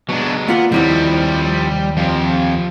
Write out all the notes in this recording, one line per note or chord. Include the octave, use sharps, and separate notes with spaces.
B2 F#3 G#3 D4
A#3 B3 F4 F#5
D#2 C3 F3 G3 C4 E4 C#5
F2 F3 G4